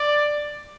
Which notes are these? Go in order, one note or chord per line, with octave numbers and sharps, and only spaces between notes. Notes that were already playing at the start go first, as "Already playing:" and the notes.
Already playing: D5